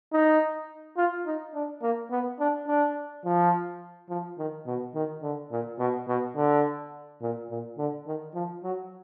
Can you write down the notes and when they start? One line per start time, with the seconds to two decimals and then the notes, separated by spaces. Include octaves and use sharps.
0.12 D#4
0.97 F4
1.26 D#4
1.54 D4
1.82 A#3
2.10 B3
2.40 D4
2.67 D4
3.25 F3
4.09 F3
4.38 D#3
4.67 B2
4.95 D#3
5.22 D3
5.51 A#2
5.79 B2
6.08 B2
6.36 D3
7.21 A#2
7.50 A#2
7.78 D3
8.06 D#3
8.34 F3
8.64 F#3